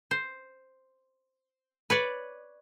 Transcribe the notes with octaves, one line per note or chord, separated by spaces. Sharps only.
C5
B4 C#5 D5